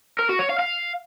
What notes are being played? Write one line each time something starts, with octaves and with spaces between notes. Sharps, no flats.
A#4
F#4
C#5
F5
F5